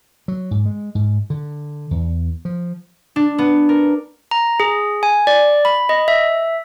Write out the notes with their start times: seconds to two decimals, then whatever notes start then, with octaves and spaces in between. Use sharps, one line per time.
0.28 F#3
0.51 G#2
0.65 G#3
0.95 G#2
1.30 D3
1.91 E2
2.45 F3
3.16 D4
3.38 B3
3.69 A#4
4.31 A#5
4.60 G#4
5.03 G#5
5.27 D5
5.65 B5
5.89 D#5
6.08 E5